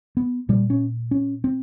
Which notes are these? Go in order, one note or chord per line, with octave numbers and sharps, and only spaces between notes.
B3
A#2 G3
C#4
C#4
C4